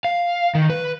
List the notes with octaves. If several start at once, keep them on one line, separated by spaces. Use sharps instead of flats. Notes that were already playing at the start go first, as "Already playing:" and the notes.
F5
D#3
B4